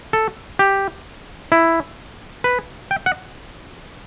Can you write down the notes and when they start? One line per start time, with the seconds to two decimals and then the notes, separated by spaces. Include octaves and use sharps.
0.13 A4
0.59 G4
1.52 E4
2.44 B4
2.91 G5
3.06 F#5